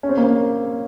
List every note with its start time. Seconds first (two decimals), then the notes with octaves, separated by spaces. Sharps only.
0.03 C#4
0.09 C4
0.17 A#3
0.23 C4